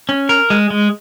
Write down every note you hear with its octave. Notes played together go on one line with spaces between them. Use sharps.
C#4
A#4
G#3
G#3